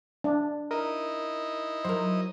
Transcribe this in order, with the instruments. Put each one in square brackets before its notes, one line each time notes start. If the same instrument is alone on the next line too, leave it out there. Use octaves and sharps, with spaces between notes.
[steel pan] D4
[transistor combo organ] D#4 E4 D#5 [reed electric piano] A#4
[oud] F#3 A#4 [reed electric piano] C5